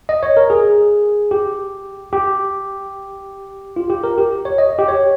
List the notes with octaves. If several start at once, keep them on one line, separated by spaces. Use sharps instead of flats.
D#5
C#5
A#4
G#4
G4
G4
F4
G4
A#4
G4
C#5
D#5
G4
C#5